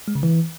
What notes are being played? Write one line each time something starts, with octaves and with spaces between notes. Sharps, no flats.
G#3
C#3
E3